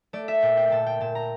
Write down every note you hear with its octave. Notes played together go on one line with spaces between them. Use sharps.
A3 D5
E5
A#2 G5
G5
A#2 G5 A5
G5
A#2 A5
A#5